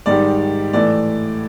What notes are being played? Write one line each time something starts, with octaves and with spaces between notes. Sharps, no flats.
G#2 D#3 G3 D5
A2 E3 A3 D5